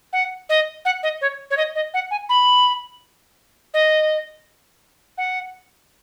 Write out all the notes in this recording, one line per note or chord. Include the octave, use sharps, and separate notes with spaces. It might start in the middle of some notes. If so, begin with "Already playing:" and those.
F#5
D#5
F#5
D#5
C#5
C#5
D#5
D#5
F#5
G#5
B5
D#5
F#5